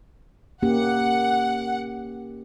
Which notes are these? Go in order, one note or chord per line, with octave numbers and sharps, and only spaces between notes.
A#3 C#4 G4 F#5